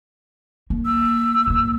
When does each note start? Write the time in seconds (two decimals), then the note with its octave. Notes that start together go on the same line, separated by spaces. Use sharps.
0.70 A#3
0.86 E6
1.47 B2 A#3